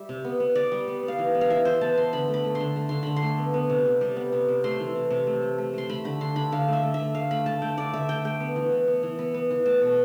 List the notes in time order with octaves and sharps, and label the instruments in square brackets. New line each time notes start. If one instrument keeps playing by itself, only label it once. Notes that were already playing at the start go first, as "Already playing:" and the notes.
Already playing: [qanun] G3 E5
C3
B3
B3
B3 D5
G3
B3
B3
F5
E3
B3
F5
E3 E5
E3 C5
B3 A5
B3 C6
D3 B5
A3
B5
A3
C6
D3
A3
D3 C6
D3 B5
C6
A3
B3
B3
C3
C3
G3
B3
C3
C3
A3 C6
E3
C3
C3
A3
A3
A3
A3 C6
A3 B5
D3 B5
D3 C6
D3 B5
D3 F5
A3 E5
A3
A3 E5
A3 F5
A3 B5
A3 A5
A3 G5
D3 D5
D3 E5
A3 G5
A3 G5
B3
E3
B3
B3
E3
B3
B3
E3
A3 A5
B2